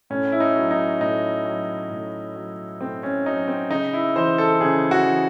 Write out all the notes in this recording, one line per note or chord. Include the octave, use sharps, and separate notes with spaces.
A2 C#4
E4
D#4
F#3
D#4
A2 D#4
F#3
A2
F#3
A2 C4
C#4
F#3 D#4
C4
C#3 D#4
E4
E3 C5
A4
C#3 G#4
F#4
E3